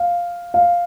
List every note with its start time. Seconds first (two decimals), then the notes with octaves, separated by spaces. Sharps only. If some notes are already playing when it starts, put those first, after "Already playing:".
Already playing: F5
0.54 F5